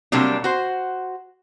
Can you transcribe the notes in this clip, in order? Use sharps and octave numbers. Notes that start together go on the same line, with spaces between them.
C3 F#3 G3 A#3 D4
F#4 C5